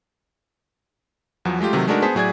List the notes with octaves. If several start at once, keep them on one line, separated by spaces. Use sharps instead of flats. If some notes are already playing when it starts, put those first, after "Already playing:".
E2 F3 F#3 B3
G#3 A3 F4 G4
C3 D#3 F#3 A3
G#3 A3 D4 D#4 F#4 A#4
B3 G#4 C5 A5 B6
A2 F#3 G#4 D5 G#6